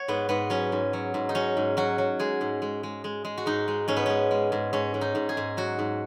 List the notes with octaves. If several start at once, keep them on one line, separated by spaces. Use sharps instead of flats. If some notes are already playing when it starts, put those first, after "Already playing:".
Already playing: C#5 F#5
G#2 B3
G#2 B3
F#3 C#4
G#2
F#3
G#2
D#4
F#3 C#4
G#2
F#3 F#4
F#3
G#3 G#4
G#2
G#3
G#3
G#3
G#3
F#4
G#2 D#4
G#3
G#2 C#4
B3
G#3 C#4
G#3
G#2
G#2 C#4
G#2
D#4
G#2
G#4
G#2
F#3 F#4
G#2